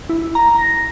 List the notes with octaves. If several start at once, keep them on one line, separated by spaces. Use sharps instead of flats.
E4
A#5
A#6